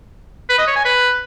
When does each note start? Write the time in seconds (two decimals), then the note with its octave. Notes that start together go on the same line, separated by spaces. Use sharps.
0.49 B4
0.58 D#5
0.67 C#5
0.76 G#5
0.85 B4